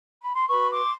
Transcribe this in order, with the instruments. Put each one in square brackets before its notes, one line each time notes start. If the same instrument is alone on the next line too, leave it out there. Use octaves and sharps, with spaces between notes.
[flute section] B5
C6
F#4 B4 B5 C#6
C6 D6